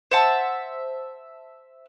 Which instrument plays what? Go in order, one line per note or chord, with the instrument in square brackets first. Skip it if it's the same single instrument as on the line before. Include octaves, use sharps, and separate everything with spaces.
[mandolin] C5 E5 F#5 A5